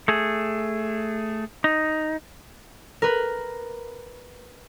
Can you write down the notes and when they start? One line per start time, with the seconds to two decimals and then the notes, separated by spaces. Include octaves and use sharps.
0.08 A3 G#4
1.64 D#4
3.02 A#4 B4